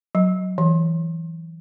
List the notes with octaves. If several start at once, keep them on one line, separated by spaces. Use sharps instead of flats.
F#3
E3